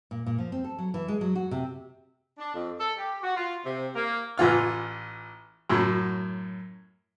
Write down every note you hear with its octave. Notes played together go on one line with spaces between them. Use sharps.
A#2
A#2
F3
C4
A4
F#3
E3
G#3
F#3
F#4
C3
D4
F2
A4
G4
F#4
F4
C3
A#3
A1 E3 F4 F6
F#2 A2 F#3